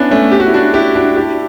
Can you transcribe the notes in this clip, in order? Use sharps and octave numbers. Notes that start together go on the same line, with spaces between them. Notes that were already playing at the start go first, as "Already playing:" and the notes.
Already playing: B3 C#4 D4 E4
A3 C#4
G4
F#4
E4
D4 F#4
E4 G4
D4 F#4
E4 G4